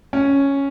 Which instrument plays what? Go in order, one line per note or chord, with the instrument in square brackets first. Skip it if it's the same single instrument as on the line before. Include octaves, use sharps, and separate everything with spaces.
[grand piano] C#4